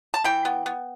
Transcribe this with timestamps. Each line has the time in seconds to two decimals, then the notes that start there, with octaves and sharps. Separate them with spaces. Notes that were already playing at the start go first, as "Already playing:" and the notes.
0.14 A5
0.24 E3 G5
0.45 B3
0.66 B3